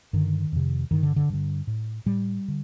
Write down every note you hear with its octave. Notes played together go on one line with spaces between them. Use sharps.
G2 D3 D#3
F2 C3
G2 D3 D#3
D3
D3
G2 D3
A2
A2 G3
D3